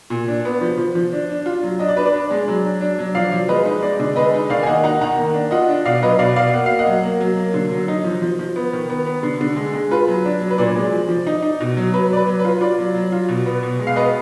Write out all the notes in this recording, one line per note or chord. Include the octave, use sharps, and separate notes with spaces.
A#2
D4
B3
F3
F3
F3
D4
D4
F4
F#3
D4 D#5
D5
D4 B4
D5
D4
G#3
F#3
D4
D4
F#3
F3 D5 F5
F3
G#3 B4 D#5
D#4
G#3 D5
D3
G#3 B4 D#5
D#4
D#3 D5 F5
G#5
A#3 D#5 F#5
D#4 F#5 A#5
D#3 F#5 A#5
A#3
D4
F4 D#5 F#5
D4
B2 D5 F5
F#3 B4 D#5
B2 D5 F5
B2 D5 F5
A#3 F#5
A#3 F5
D#5 F#5
F#3
A#3
F#3
A#3
D3
F#3
D#4
F3
F3
F3
B3
D#3
B3
B3
D3
D3
G#3
G#3
F4 B4
F#3
D4
F#3
B4
A#2 D5
G#3
F3
F3
D#4
D#4
B2
F#3
F#3 B4
F#3 D5
B4
F#3
B4
F4
F4 D5
F#3
F#3
F4
B2
B3
B2
G#3
F5
B3 B4 D#5